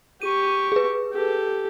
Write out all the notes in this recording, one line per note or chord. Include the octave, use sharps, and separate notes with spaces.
G4 C#6 D#7
G#4 B4
G4 A4